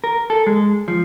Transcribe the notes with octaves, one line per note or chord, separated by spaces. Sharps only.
A#4
A4
G#3
F3